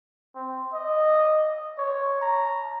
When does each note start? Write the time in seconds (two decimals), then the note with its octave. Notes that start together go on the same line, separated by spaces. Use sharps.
0.35 C4
0.73 D#5
1.78 C#5
2.22 A#5